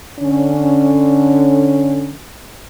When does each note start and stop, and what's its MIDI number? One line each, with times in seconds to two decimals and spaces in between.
0.19 2.14 50
0.19 2.14 61